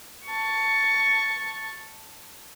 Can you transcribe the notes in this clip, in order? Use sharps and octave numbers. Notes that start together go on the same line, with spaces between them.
A5 C#6